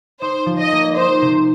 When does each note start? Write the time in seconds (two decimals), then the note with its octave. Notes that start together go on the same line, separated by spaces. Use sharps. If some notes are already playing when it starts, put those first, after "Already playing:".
0.21 D#4 C5
0.46 F3
0.59 D#5
0.72 A#3
0.97 D#4 C5
1.22 C3